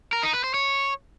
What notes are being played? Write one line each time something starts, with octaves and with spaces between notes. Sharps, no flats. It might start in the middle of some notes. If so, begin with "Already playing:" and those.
A#4
D#4
B4
C5
C#5